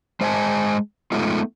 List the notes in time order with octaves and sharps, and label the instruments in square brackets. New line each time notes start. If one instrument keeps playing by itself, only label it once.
[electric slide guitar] G#3 C5 D#5 F5 G#5 A5
G#3 A3 B3 D#4 F4